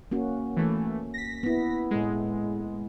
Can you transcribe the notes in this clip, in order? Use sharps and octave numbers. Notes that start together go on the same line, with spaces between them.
A#3 C#4 F#4
E3 A3
A#6 B6
B3 E4
A2 G#3